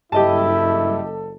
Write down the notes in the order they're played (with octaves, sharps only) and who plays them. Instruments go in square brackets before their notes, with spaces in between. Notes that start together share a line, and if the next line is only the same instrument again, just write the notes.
[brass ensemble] F#1 A4 [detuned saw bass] G2 [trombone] E4 [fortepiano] G4 D#5 A5